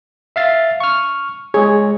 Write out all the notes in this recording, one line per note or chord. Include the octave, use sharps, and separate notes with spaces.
E5 F5 A6
C#6 F6
G#3 G#4 C#5